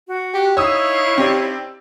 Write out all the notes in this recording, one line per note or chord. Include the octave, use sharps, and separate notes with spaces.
F#4
G4
D#4 E4 C#5 F5 D#6 E6
C4 G4 D5